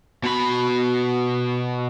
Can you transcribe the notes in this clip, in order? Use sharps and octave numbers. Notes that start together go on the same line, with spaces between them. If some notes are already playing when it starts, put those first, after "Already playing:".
B2 B5